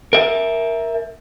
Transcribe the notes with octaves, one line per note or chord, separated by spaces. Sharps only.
A#4 E5